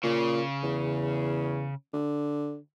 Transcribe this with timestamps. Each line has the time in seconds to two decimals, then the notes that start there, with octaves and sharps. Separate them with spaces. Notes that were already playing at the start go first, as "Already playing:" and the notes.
0.04 A#2 C#3
0.63 E2
1.93 D3